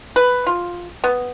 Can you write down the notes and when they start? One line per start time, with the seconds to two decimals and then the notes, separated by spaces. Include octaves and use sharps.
0.16 B4
0.47 F4
1.04 B3